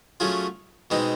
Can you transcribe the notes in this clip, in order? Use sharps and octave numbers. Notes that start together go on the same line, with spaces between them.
F#3 A3 C#4 F4 G#4
B2 G#3 C4 D#4